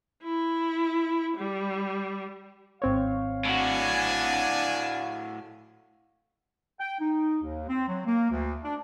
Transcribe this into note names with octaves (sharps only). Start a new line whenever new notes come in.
E4
G3
G#1 C4 C#5 F5
A2 D4 F#4 G#5
G5
D#4
D#2
C4
F#3
A#3
D2
D4